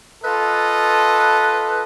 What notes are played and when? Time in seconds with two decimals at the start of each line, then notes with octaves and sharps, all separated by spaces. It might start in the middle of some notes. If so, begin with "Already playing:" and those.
0.24 F4 A4 B4 D#5